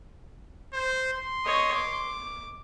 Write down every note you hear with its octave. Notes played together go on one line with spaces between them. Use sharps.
C5
C6
C#5 D#5
D6